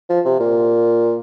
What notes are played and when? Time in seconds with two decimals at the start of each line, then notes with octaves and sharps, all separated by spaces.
0.09 F3
0.25 C3
0.40 A#2